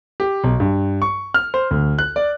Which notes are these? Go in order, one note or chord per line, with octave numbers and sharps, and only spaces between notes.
G4
B1
G2
C#6
F6
C5
D2
F#6
D5